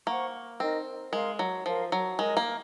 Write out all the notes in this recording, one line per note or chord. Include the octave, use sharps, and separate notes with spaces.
A#3 C5 F#5 C#6
C4 D#4 A#4 D#5
G#3 A#4 F5 C6
F#3
F3 A#4 F5 C6
F#3
G#3 A#4 D#5 G#5
A#3